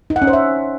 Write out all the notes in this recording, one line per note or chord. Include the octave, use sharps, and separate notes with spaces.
D#4
F#5
C#4
C5
E5